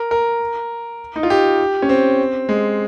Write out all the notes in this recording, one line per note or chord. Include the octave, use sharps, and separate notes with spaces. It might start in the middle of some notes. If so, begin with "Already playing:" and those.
Already playing: A#4
A#4
D#4
F4
G4
C#4
C4
G#3